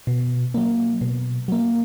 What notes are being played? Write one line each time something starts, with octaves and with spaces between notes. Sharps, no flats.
B2
F#3 A#3
B2
F#3 A#3